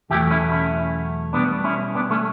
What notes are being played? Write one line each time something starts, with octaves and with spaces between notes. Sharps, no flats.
E2 B2 F#3 A3 E4 G4
C#4 E4
C#4 E4
B2 G3 B3 D4
C#4 E4
B3 D4
A3 C#4